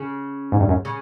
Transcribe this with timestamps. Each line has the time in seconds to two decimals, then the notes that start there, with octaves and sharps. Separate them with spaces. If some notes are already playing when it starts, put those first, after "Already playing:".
Already playing: C#3
0.52 G#2
0.60 G2
0.69 F#2
0.85 C#3